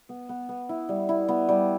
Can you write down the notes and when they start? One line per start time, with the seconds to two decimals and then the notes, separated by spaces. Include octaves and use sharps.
0.09 B3
0.29 B3
0.49 B3
0.69 E4
0.89 G3
1.09 E4
1.28 B3
1.49 G3